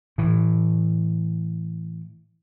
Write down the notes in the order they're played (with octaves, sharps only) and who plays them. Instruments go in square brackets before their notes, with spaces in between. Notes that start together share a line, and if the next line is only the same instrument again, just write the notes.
[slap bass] A2 E3